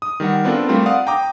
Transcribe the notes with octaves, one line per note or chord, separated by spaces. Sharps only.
D#6
D#3 G3 A#4 F#5
B3 C4 D4 F4 A4 A#4
G3 A3 C4 F4 A#4
D5 F5 F#5 D#6
G5 A#5 D6 D#6